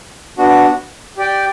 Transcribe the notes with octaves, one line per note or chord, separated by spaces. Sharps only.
B3 D4 F#4
G4 D5 G5